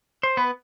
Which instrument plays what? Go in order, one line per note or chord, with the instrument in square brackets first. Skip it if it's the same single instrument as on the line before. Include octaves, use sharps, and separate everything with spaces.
[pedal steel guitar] C5
B3 B4